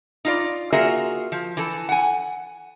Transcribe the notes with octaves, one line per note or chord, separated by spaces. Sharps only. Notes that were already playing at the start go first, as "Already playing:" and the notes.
D#4 F4 D5
A#3 F4 F#4 G#4 A#4 E5
F3
E3 A4
F#5 G#5